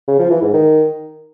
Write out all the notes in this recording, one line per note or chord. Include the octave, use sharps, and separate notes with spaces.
C#3
F3
E3
G#2
D#3